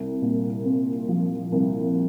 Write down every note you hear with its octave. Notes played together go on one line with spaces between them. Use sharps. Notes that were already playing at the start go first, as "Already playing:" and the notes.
Already playing: C2
A#2
C4
F3
C2